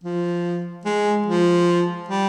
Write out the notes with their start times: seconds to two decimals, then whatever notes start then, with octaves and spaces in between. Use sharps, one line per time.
0.03 F3
0.85 G#3
1.26 F3
2.08 G3